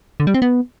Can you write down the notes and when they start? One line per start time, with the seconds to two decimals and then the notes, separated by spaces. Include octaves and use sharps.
0.20 D3
0.27 G3
0.34 C4
0.42 B3